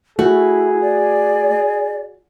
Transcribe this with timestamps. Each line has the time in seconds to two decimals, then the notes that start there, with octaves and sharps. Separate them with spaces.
0.19 A3 E4 F#4 G#4
0.81 D5